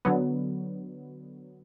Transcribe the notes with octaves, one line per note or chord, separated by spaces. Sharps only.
D3 F#3 B3